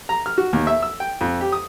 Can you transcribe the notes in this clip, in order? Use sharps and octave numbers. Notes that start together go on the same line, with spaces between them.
A#5
F6
F#4
D#2
E5
E6
G5
F2
G4
D#6